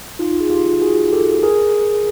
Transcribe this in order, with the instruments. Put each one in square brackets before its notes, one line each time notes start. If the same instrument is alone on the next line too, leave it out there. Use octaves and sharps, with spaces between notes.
[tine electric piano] D#4 F4
G#4
F4 G4
F#4 G#4
G4 A4
G#4 A#4